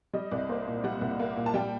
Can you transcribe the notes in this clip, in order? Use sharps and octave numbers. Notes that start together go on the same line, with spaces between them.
G3 D#5
C2 D5
A#3 C5
A#2
G3 F#5
C2
A#3
A#2
A5
G3 G5